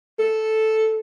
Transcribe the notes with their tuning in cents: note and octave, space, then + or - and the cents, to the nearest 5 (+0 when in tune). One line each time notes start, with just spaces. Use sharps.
A4 -5